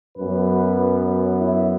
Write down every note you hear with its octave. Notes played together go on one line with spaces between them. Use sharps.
F#2 F#3 B3 B4
E4